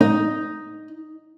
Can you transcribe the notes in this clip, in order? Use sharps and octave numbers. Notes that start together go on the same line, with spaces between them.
D#4